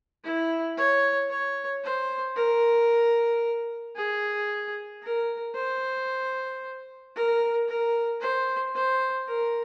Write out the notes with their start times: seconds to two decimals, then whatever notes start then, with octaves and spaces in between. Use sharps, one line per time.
0.24 E4
0.77 C#5
1.30 C#5
1.84 C5
2.36 A#4
3.96 G#4
5.02 A#4
5.55 C5
7.15 A#4
7.68 A#4
8.21 C5
8.75 C5
9.27 A#4